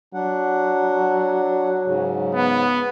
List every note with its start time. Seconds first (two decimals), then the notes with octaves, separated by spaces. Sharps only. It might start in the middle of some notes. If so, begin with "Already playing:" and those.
0.14 F#3 D4 F#5
1.86 G#2 C#3
2.35 B3